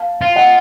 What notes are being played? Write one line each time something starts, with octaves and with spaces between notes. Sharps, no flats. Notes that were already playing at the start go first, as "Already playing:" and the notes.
Already playing: F5 A5
F4
D#5 F#5